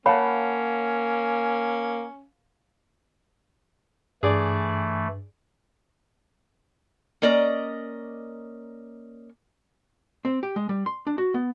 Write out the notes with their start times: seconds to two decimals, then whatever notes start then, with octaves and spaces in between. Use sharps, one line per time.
0.06 A#3 C#4 C#5 F5 F#5 A5 B5
4.23 G2 E3 A3 G#4 D5
7.22 A#3 C#4 D5 D#5 A#5
10.25 C4
10.43 G4
10.56 G#3
10.69 G3
10.86 C6
11.07 D4
11.18 F#4
11.34 B3